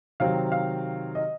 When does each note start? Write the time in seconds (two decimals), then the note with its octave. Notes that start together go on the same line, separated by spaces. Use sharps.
0.20 C3 D#3 F#3 C4 F5
0.52 F5
1.15 D#5